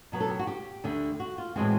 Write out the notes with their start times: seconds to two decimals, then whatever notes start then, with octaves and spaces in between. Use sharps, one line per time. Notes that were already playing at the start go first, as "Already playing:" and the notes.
0.12 B2 F#3 B3
0.20 A4
0.30 G4
0.39 F#4
0.47 G4
0.84 D2 D3 G3
1.20 F#4
1.38 F4
1.56 A2 E3 G#3 C4 F#4